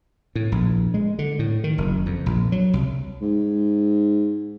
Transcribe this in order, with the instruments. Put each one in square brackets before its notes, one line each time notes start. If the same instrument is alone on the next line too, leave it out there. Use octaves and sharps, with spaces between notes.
[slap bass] A2
A#1
G#3
D3
A2
D#3
F#1
F2
A#1
F#3
C2
[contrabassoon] G#2